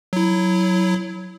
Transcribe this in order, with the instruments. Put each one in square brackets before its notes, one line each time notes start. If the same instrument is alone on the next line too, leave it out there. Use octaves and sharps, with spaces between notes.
[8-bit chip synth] F#3 E4